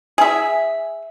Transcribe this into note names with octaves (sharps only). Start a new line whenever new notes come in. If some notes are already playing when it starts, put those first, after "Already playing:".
G#4 E5